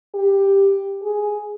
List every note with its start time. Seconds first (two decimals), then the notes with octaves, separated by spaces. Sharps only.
0.14 G4
1.03 G#4